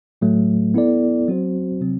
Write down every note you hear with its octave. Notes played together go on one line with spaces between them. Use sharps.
A2 F#3 A3
B3 E4 A4 D5
F#3 C4 F#4 C5
C3 F#3 C4